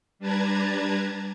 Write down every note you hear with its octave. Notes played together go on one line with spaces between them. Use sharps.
G3 D4 B4 A5 A#5 G#6